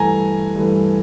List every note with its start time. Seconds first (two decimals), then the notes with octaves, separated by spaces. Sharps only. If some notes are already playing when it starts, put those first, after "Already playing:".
Already playing: G2 E3 A3 G#5 A#5
0.56 G2 E3 A3